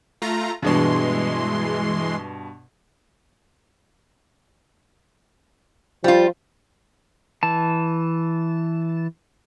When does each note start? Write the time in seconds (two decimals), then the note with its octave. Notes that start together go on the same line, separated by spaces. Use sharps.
0.22 A3 F4 A#5
0.62 G2 B2 E3 G#3 C6
6.04 F3 G3 F4
7.43 E3 A5